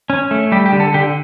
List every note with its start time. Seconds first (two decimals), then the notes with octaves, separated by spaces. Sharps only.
0.10 C#4
0.31 A3
0.52 G3 G4
0.66 G4
0.72 D3
0.80 A4
0.94 D3 G4